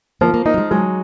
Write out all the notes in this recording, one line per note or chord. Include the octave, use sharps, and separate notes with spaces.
F3 A#3
A#3
A#3 D#4
F#3
G#3
F#3 G#3